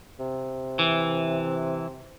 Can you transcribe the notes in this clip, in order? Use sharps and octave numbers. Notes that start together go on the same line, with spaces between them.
C3
E3